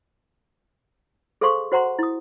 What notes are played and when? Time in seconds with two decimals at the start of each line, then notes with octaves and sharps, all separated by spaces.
1.41 G#4 A4 C5 F5 C6 C#6
1.72 F#4 C5 F#5 A#5 C6
1.99 E4 D#6